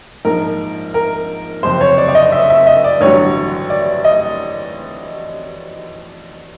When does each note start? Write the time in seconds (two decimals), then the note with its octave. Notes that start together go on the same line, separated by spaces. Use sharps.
0.25 A#1 G#2 F3 A#4
0.94 A#4
1.63 F#1 F2 C3 C5
1.81 C#5
1.98 D5
2.09 D5
2.15 D#5
2.32 E5
2.50 E5
2.67 D#5
2.84 D5
3.01 A1 G2 D3 F#3 C#5
3.70 D5
4.04 D#5